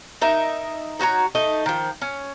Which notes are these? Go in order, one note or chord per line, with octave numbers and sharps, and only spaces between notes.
D#4 A#4 E5
D#4 F#4 C#5 A#5
A3 D#4 D#5
D#3 F3
C#4